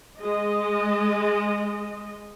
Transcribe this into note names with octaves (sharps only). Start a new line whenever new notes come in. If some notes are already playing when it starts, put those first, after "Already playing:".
G#3 D#5